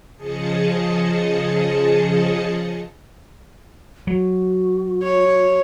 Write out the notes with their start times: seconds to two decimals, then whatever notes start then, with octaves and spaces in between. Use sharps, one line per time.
0.17 C#3 F3 G#4 D#5 A5 C#7
4.07 F#3 F#4
5.03 C#5